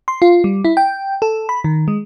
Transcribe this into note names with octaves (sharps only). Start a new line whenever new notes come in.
C6
F4
G3
E4
G5
A4
B5
D#3
G#3